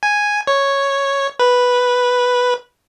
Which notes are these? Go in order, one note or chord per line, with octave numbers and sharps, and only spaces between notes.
G#5
C#5
B4